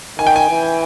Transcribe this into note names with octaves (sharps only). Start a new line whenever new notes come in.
D#3 G#5
G5
G#5
E3